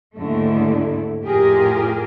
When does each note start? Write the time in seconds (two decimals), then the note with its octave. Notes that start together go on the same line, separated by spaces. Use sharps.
0.17 D#2 G#2 D3 A3 E4
1.23 F2 A2 F4 G4 G#4 A#4